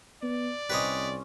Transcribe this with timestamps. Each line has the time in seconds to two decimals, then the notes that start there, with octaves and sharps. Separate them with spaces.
0.23 B3 D5
0.70 C2 G3 C4 C#4 B4 C#5 D#5